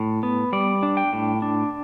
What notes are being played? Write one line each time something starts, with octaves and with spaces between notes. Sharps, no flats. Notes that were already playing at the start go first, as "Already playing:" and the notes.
Already playing: A2
B3
G3 D5
D4
G5
A2
D4